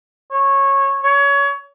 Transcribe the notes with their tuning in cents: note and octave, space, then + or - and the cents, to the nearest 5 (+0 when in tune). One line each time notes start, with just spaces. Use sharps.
C#5 -15
C#5 +25